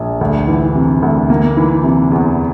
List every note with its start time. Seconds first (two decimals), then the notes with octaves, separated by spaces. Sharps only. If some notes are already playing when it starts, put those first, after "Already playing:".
Already playing: A#1
0.21 D2
0.48 E3
0.75 C3
1.02 D2
1.30 A#3
1.57 E3
1.84 C3
2.12 E2